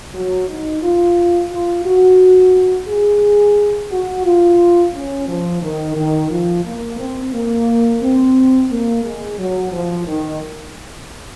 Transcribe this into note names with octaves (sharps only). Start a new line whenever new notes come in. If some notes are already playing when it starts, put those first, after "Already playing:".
F#3
D#4
F4
F4
F#4
G#4
F#4
F4
C#4
F3
D#3
D#3
F3
A#3
C4
A#3
C4
A#3
G#3
F#3
F3
D#3